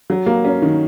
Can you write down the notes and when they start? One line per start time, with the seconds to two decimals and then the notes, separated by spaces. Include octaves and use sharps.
0.10 F#3
0.26 A#3
0.45 C#4
0.62 D#3